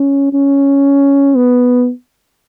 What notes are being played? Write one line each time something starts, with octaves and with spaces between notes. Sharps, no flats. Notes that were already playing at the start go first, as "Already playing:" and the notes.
Already playing: C#4
C#4
B3